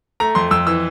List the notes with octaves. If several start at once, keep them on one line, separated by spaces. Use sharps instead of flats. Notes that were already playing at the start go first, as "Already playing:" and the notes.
A3 A#5
F2 C6
F2 E6
E3 E6